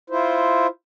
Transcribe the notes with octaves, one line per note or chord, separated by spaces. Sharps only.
E4 F4 C5